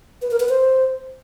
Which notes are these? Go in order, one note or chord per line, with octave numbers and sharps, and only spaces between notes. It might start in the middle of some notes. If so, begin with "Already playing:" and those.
B4
A#4
B4
C5